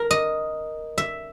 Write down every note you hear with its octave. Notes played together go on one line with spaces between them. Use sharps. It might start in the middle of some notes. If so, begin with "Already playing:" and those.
Already playing: A#4
D#5
E5